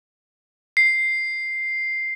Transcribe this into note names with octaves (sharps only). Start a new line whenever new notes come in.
C7